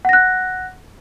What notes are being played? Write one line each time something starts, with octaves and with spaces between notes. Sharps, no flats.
F#5 F#6 A#6